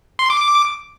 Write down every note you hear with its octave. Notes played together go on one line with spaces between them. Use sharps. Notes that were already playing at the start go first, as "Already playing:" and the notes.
C6
D6
D6